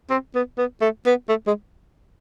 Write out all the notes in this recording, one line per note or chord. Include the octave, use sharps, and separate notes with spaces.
C4
B3
B3
A3
B3
A3
G#3